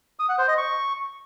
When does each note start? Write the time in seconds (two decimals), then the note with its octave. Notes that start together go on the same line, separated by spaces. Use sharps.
0.19 D#6
0.29 F#5
0.39 C5
0.48 D#5
0.58 C#6